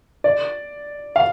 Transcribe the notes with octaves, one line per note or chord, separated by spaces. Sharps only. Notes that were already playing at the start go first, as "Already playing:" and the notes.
D5
F5